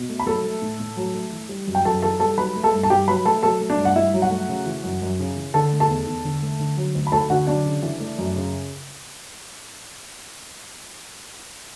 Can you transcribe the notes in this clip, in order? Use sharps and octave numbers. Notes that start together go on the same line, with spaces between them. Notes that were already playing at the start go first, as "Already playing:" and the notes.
Already playing: B2
A3
B5
F#3 A4 A5
A3
A2
A2
F#3
A3
E3
G3
F#2
G5
F#2 A4 A5
E3 A4 A5
G3 A4 A5
F#3 B4 B5
A3
A4 A5
G2
A5
G2 G4 G5
F#3 B4 B5
A3 A4 A5
F#3 A4 A5
A3
D4 D5
G2
F#5
G2 E4 E5
F#3
F#4 F#5
A3
C#3
E3
F#2
F#2
C#3
E3
D3 A4 A5
A3
A4 A5
E2
E2
D3
A3
D3
F#3
D2
B5
D2 A4 A5
D3 F#4 F#5
F#3 D4 D5
C#3
E3
A3
F#2
C#3